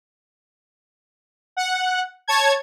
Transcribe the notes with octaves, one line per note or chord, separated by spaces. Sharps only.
F#5
C#5 A5 G#6